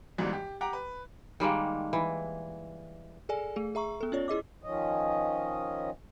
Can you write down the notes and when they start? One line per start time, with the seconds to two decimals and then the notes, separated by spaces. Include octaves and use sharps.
0.18 G#1 G#2 B2 E3 G3
0.33 G4
0.61 G4 F#5 G5 A#5 D6
0.73 B4
1.40 D#3 G3 G#3 A#3
1.93 E3
3.29 G#4 A4 D5 G#5
3.56 A3 G#4
3.75 G#4 E5 A#5 C#6
4.01 B3 A4
4.12 C#4 F4 C#5 D5
4.28 E4 G#4 D#5 D6
4.64 D#3 F3 C#4 D#5